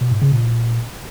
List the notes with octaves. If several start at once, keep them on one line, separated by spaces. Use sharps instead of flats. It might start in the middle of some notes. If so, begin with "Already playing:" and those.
B2
G#2
C#3
A#2